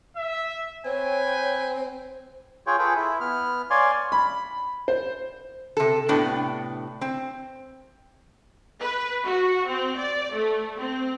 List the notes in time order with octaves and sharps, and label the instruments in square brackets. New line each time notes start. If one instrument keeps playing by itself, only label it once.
[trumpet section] E5
[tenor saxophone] C4 [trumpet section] B4 G5 G#5 [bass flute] C#5
[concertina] F4 G#4 C#5 G5
F4 G#4 A4 B4 G5
E4
B3 F6
C#5 D5 F5 G#5 C6
[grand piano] B5
C5
[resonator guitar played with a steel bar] C3 A4
A2 C3 B3 D4
C4
[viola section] B4
F#4
C4
D5
A3
C4